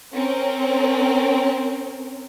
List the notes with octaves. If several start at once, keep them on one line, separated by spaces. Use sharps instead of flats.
C4 C#4 A#4